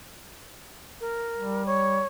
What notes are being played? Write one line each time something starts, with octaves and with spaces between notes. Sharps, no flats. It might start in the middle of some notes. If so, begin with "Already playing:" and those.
A#4
G3
C#5